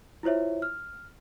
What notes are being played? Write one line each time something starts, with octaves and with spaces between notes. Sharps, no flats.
E4 F4 C5 C#5 E5
F6